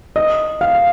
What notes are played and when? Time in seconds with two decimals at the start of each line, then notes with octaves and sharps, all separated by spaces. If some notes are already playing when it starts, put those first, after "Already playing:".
0.16 D#5
0.61 F5